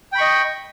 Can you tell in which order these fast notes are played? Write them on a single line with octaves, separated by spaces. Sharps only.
G5 B5 C#6 D#5